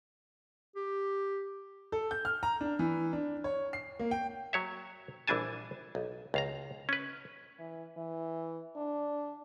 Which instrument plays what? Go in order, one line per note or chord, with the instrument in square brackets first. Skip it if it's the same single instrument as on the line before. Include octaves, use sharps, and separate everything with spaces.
[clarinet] G4
[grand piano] A4
G6
F6
A#5
D4
E3
D4
C#5
C7
A#3
G5
[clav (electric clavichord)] F#3 C#5 E5
A#1 E3 G3 D4 G#5 A5
B1
C#2 F5 A#5
C#4 B4
[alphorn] E3
E3
D4